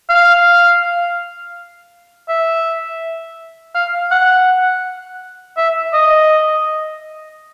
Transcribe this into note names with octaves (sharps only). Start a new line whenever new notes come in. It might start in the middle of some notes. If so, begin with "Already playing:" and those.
F5
E5
F5
F#5
E5
D#5